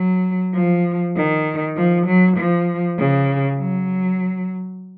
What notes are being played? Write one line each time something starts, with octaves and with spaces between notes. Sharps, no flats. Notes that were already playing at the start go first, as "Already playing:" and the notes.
Already playing: F#3
F3
D#3
F3
F#3
F3
C#3
F#3